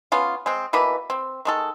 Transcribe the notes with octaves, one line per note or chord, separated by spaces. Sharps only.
B3 C#4 F4
G#3 C4
B2 E3 A#3 B4
C4
D#3 G#3 A4